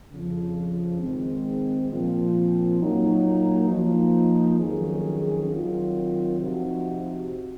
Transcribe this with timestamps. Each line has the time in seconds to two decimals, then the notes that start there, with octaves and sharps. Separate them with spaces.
0.11 F2 C#3 F3
1.00 G#2 D#3 G#3 C4
1.90 A#2 F3 C4
2.80 A#2 F#3 A#3 D#4
3.69 F3 A#3 D#4
4.59 F2 D#3 F#3 C#4 G#4
5.49 D#3 F#3 C4 F4
6.39 C3 F3 C4 D#4 F#4